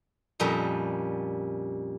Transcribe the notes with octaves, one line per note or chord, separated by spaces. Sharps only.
F2 A#2 G3 C#4 D#5